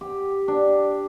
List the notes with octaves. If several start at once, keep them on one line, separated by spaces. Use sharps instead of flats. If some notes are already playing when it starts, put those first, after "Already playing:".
G4
D4